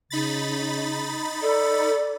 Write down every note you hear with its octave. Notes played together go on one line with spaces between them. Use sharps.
C#3 D#4 B5 A6
A4 D5